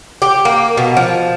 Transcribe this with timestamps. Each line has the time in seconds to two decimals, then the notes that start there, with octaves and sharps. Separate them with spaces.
0.22 G4
0.45 A#3
0.77 B2
0.97 F3